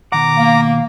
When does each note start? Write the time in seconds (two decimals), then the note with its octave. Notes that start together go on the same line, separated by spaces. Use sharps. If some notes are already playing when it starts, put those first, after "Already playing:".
0.12 B2 D#3 F#5 A#5 D6
0.37 A#3 F5